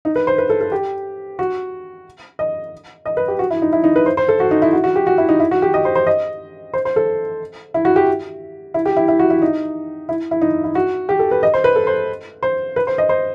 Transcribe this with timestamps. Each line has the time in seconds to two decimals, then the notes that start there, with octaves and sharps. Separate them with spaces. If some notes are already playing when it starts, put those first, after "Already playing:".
0.05 D#4
0.16 B4
0.27 C5
0.38 B4
0.50 A4
0.61 A4
0.72 G4
1.39 F#4
2.39 D#5
3.06 D#5
3.17 B4
3.28 G4
3.39 F#4
3.51 E4
3.62 D#4
3.73 E4
3.84 D#4
3.96 B4
4.06 C5
4.17 C5
4.28 A4
4.40 F#4
4.51 D#4
4.62 E4
4.73 F#4
4.84 F#4
4.96 G4
5.07 F#4
5.18 E4
5.29 D#4
5.40 E4
5.51 F#4
5.62 G4
5.74 D#5
5.85 C5
5.95 C5
6.07 D#5
6.73 C5
6.85 C5
6.96 A4
7.74 E4
7.85 F#4
7.96 G4
8.74 E4
8.86 G4
8.96 E4
9.08 E4
9.19 F#4
9.30 E4
9.42 D#4
10.09 E4
10.31 E4
10.41 D#4
10.64 E4
10.75 F#4
11.09 G4
11.19 A4
11.31 B4
11.43 D#5
11.54 C5
11.64 B4
11.76 A4
11.87 C5
12.43 C5
12.76 B4
12.87 C5
12.98 D#5
13.09 C5